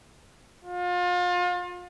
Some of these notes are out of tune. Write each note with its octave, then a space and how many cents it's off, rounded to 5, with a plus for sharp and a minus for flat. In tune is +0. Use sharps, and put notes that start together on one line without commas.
F4 +35